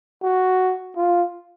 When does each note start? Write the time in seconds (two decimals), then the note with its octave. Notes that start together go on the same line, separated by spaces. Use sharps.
0.23 F#4
0.97 F4